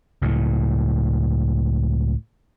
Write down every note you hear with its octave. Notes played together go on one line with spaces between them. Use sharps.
C#2 A2